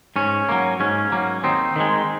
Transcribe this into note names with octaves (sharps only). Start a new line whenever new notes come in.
G#2 C#4
F#3 A#3
G#2 C#4
F#3 A#3
D#2 C4 D#4
D#3 G#3